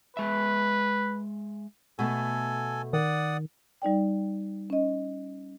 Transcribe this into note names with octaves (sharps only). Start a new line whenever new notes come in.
G#3 B4 E5
B2 A3 A4 G#5
D#3 D5 F#5 D#6
G3 D#4 D5 G5
C#4 D#5